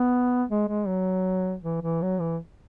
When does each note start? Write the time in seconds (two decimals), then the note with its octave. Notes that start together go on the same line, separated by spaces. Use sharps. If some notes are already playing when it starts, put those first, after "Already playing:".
Already playing: B3
0.50 G#3
0.68 G#3
0.87 F#3
1.63 E3
1.82 E3
2.02 F#3
2.20 E3